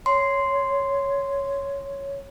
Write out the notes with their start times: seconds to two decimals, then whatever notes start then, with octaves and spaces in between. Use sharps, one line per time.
0.06 C#5 C6